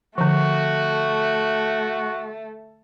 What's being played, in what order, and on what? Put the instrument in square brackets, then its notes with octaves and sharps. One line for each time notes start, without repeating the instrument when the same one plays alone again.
[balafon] D3 F3 [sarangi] A3 [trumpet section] F#4